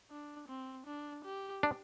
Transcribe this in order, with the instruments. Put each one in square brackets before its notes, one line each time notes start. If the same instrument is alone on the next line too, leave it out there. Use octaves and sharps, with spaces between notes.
[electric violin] D4
C4
D4
G4
[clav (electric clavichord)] D4